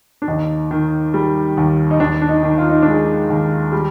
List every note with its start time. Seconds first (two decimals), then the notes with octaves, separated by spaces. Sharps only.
0.22 D4
0.28 D#2 D#4
0.71 D#3
1.14 G3
1.57 D#2
1.91 D#4
2.00 D#2 D4
2.22 D4
2.29 D#4
2.43 D#3
2.58 F4
2.70 D#4
2.82 G#3 D4
2.94 D#4
3.30 D#2
3.72 G3